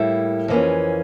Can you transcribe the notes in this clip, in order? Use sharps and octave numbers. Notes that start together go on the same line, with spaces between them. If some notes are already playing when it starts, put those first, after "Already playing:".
Already playing: A2 G3 A#3 E4 A4
F2 E3 A#3 C#4